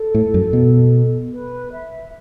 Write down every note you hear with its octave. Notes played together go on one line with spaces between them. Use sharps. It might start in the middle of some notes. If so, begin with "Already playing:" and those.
Already playing: A4
A2
F#2
B2
B4
E5